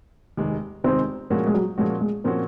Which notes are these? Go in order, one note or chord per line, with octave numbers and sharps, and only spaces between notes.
F1 D#2 D#3 G#3 D#4
F1 D#2 D#3 G#3 C4 D#4
A#2 F3 G#3 A#3 C#4 F#4
G#3
F#3
A#2 F3 G#3 A#3 C#4 F#4
G#3
A#2 F3 A#3 C4 C#4 F#4